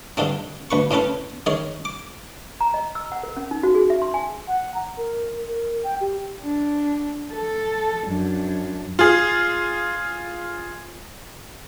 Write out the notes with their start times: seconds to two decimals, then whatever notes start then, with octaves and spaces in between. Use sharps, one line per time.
0.17 G2 D3 G#3 C4
0.71 D2 B4 C#6
0.91 A2 C4 C#4 A4 B4
1.46 D#3 G#3 G#4 C#5
1.85 D6
2.61 A#5
2.74 D#5
2.95 E6
3.12 F#5
3.23 A#4
3.37 C#4
3.51 D#4
3.63 F#4
3.75 G#4
3.90 E5
4.02 C6
4.14 G#5
4.48 F#5
4.74 A#5
4.97 A#4
5.48 A#4
5.84 G5
6.01 G4
6.41 D4
7.33 A4
8.08 F#2 D4
8.99 F4 G#4